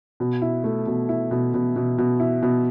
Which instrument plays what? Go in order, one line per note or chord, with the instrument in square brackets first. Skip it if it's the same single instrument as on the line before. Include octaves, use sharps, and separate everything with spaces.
[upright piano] B2
E4
A3
B2
E4
B2
B2
B2
B2
E4
B2